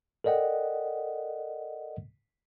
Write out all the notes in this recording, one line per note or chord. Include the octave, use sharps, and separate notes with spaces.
A4 A#4 D5 D#5 F#5 G5